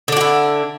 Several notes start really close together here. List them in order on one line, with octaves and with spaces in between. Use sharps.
D3 D4 F#4 E4